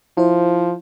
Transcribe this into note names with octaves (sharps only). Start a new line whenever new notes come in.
F3 E4 C5